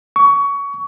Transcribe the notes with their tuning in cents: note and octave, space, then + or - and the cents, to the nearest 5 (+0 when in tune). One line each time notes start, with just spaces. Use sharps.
C#6 +25